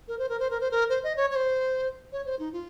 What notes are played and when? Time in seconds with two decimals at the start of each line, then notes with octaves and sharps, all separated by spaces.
0.08 A#4
0.19 C5
0.29 A#4
0.40 C5
0.51 A#4
0.61 C5
0.71 A#4
0.89 C5
1.04 D#5
1.17 C#5
1.31 C#5
1.36 C5
2.12 C#5
2.26 C5
2.39 D#4
2.53 F4